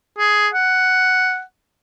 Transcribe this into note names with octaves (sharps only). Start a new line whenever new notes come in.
G#4
F#5